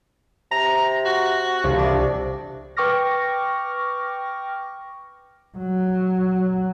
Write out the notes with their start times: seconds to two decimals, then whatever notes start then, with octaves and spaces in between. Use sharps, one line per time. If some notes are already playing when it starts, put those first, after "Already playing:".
0.51 C3 A#5
1.05 F#4
1.64 C2 F3
1.78 C3 D4
2.77 B4 G5 C#6 D6 F6 A#6
5.58 F#3